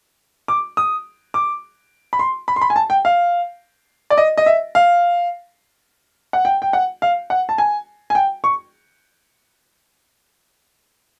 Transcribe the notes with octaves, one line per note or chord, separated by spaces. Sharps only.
D6
D#6
D6
B5
C6
B5
C6
B5
G#5
A5
G5
F5
D5
D#5
D#5
E5
F5
F#5
G5
G5
F#5
F5
F#5
A5
G#5
G#5
G5
C#6